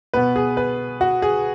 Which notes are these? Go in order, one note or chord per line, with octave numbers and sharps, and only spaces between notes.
B2 B3 B4
G#4
B4
F#4
G#4